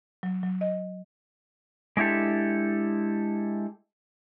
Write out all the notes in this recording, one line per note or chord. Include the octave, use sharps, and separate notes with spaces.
F#3
F#3
D#5
G#3 D4 E4 G4 A4